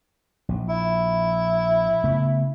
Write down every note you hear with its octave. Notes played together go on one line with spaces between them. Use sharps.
A#1
E4
C#3 A3 B3